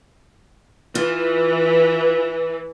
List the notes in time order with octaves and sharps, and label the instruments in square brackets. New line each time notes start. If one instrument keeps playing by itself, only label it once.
[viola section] E3 [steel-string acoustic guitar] F4 E5